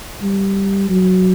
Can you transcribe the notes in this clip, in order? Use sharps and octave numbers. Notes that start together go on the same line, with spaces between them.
G3
F#3